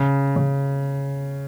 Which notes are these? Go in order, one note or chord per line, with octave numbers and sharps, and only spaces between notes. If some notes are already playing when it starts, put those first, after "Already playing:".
Already playing: C#3
C#3